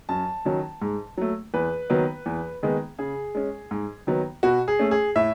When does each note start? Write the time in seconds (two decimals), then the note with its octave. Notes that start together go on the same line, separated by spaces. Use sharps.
0.09 F#2 A5
0.45 D#3 F#3 C#4
0.81 G#2
1.17 F#3 A3
1.54 E2 B4
1.90 D#3 F#3 B3
2.26 E2
2.63 D#3 G#3 B3
2.99 C#3 G#4
3.35 G#3 C#4
3.71 G#2
4.07 D#3 F#3 B3
4.43 B2 F#4
4.68 G#4
4.79 A3 C#4
4.91 G#4
5.16 A2 E5